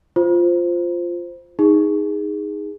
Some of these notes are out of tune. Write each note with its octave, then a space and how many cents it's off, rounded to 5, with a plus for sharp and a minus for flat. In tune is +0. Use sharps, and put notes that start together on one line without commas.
F4 +0 C5 +0
D#4 +5 G#4 -15